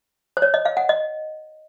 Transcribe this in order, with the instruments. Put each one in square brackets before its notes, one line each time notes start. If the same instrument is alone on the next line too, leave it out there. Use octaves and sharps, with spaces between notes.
[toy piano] C5
C#5
D#5
F5
F#5
D#5